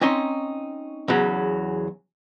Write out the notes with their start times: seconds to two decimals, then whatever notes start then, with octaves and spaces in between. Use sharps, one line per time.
0.01 C4 C#4 D#4 C6
1.08 E2 C#3 F#3 C#4